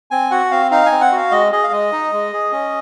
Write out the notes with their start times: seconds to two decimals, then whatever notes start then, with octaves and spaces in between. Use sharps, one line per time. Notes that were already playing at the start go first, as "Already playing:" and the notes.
0.11 C4 G#5
0.31 F#4 F#5
0.51 C4 F5
0.71 D#4 F5
0.86 G#5
0.92 C4
1.01 F#5
1.12 F#4 F5
1.31 G#3 D#5
1.52 G#4 D#5
1.64 F5
1.72 G#3 D#5
1.92 D#4
2.13 G#3
2.33 G#4
2.52 C#4